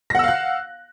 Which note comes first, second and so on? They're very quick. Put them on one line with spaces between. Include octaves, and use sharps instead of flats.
A#6 F#5 E6 F5 F#6